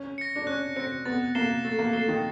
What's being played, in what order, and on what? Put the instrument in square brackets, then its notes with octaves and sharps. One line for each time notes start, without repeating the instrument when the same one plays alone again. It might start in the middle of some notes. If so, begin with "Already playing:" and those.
Already playing: [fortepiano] C#4
[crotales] A#6 C#7
[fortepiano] D4
[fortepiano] C#4 [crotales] F#6
[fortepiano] C4 [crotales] A#6 C#7
[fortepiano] B3 [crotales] A6
[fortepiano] A#3 [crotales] C7 E7 G7
[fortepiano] A3 [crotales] A6
[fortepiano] A#3
[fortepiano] A3 [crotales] C7 E7 G7
[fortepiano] D#3